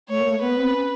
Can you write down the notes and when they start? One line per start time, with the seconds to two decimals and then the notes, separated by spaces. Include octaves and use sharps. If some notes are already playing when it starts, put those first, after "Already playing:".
0.09 A3 C#5
0.20 A#3
0.30 A3
0.41 B3 B4
0.57 C4
0.72 C#4